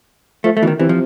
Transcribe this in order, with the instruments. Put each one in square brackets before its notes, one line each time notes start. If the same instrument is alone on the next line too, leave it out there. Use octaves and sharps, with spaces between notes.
[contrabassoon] F3 [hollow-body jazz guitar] A3
[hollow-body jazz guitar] A3
[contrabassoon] B2 [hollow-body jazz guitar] E3
[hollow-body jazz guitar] D#3
[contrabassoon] C3 [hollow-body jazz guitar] E3
[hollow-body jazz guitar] F3